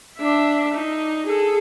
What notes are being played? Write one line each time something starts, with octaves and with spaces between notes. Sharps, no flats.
D4 E5
D#4
G#4 A4